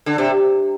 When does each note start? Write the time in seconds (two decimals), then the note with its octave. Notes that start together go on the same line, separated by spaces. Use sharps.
0.06 D3
0.18 C3